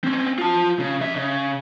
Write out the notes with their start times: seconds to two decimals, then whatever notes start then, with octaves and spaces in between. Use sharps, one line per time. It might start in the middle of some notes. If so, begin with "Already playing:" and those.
0.04 C4 C#4
0.38 F4 A5
0.79 C#3
1.01 F2 E5
1.16 C#3